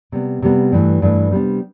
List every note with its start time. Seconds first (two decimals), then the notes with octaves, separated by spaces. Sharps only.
0.12 C3 G3 B3
0.42 C3 G3 B3
0.72 G2 E3 A3
1.02 G2 E3 A3
1.31 C3 G3 B3 D4